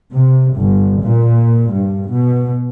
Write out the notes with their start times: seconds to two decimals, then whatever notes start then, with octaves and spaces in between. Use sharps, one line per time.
0.13 C3
0.55 G1
1.02 A#2
1.72 G2
2.12 B2